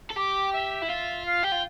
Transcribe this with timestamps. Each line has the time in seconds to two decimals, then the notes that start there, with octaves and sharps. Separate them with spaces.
0.10 A4
0.16 G4 D6
0.53 E5
0.82 E4
0.90 F4
1.26 F5
1.43 G4 G5
1.52 F4